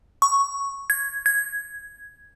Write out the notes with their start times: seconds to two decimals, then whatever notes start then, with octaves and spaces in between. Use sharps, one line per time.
0.22 C#6
0.90 G#6
1.26 G#6